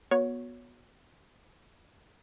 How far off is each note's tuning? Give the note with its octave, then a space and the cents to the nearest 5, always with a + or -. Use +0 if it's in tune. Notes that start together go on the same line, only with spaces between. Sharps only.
B3 -20 F#4 -25 C#5 +10